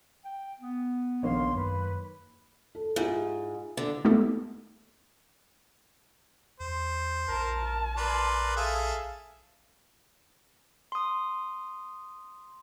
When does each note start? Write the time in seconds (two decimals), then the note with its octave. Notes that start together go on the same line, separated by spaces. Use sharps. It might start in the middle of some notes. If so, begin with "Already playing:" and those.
0.24 G5
0.59 B3
1.23 A#1 D#3 F3 A#3 D4 C#5 F5 C6
1.55 F#2 B4
2.75 A4
2.96 G#2 E4 F4 G4
3.77 D3
4.05 G#3 A3 B3 D#4 G4 A4
6.60 E2 C5
7.29 A#1 A#4 A5
7.97 A#4 B4 D5 C6
8.56 G#4 A4 E5 F5
10.92 C6 D#6